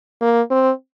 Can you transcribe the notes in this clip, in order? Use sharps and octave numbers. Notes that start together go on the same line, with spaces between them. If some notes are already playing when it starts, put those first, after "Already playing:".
A#3
C4